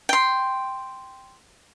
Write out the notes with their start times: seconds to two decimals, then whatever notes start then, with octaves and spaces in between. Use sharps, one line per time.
0.09 G5 C6